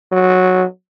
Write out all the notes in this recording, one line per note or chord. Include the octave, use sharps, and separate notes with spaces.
F#3